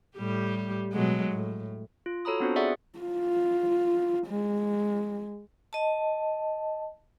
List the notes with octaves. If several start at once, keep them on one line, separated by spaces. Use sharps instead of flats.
A2 G3 G4
B2 F#3 G#3
A2
F4
F#4 A4 C#5 A#5 B5 D#6
B3 C4 D4 F4 F#4 C5
G#4 D5 E5 F#5 C#6 D#6
F4
G#3
D#5 A5